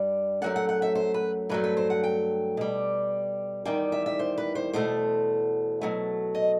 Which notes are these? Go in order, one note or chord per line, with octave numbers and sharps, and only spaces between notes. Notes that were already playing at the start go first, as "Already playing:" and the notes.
Already playing: G2 G3
F#2 F#3 A3 F#5
F#5
F#5
E5
C5
B4
G2 F#3 A3 B4
B4
C5
F#5
G5
B2 G3
E2 D#3 G3 G5
E5
E5
C5
B4
C5
E2 B2 A3 C5
B2 F#3 A3
D#5